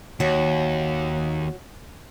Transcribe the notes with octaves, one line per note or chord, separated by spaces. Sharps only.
D#2 F#4 C#5